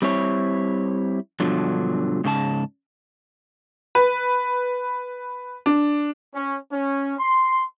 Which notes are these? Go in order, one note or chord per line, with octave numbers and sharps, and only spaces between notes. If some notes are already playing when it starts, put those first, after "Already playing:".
G3 C4 E4 C#5
G2 B2 D3 F3 F#3
G#2 C#3 G4 A5
B4
D4
C#4
C#4
C6